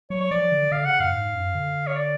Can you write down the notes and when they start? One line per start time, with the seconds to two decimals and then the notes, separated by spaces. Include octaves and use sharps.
0.10 F#3 C#5
0.21 C#5
0.31 F3 D5
0.52 D3
0.72 D3 F5
0.85 C#3 F#5
1.00 F#2 F5
1.14 G#2
1.34 F#2
1.55 D3
1.87 C#5
1.96 D5